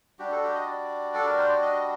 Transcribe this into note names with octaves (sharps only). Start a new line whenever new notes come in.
G3 D4 F#4 G4
A4
G4
D#5
D5
A4
A#4
C5
D5
D#5